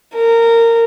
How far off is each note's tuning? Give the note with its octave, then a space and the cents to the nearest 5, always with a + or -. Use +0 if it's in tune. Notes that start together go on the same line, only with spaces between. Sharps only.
A#4 -20